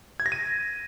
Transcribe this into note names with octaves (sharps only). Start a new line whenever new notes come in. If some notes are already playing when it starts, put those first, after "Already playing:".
G#6
A#6
D#7